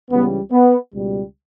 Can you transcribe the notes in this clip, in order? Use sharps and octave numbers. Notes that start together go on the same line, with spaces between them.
C#2 C#3 E3 G3 B3
B3
C#2 B2 G3